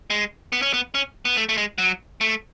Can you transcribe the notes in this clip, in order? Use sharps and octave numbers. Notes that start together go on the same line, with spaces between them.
G#3
B3
C#4
B3
C#4
B3
A3
A3
G#3
F#3
A3